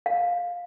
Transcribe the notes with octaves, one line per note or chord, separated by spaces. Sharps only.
F5